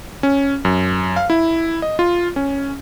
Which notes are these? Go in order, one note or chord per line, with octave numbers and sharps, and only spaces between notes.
C#4
F#2
F5
E4
D#5
F4
C#4